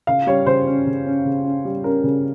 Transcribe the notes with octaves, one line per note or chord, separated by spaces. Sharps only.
C#3 F5
G3 C#5
C#3 C5
C#4
C#3
C#4
C#3
C#4
G3
C#4 A#4
C#3